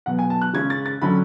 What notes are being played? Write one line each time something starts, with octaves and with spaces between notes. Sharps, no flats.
B2 F#3 B3 F#5
G#5
A5
F#6
C#3 G#3 C#4 G#6
A6
A6
D3 F#3 C#4 B5